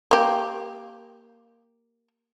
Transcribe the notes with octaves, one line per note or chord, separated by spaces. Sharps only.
A#3 G4